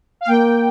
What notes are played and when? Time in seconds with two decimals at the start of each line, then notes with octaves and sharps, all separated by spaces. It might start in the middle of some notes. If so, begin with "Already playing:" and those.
0.21 F5
0.27 A#3 G5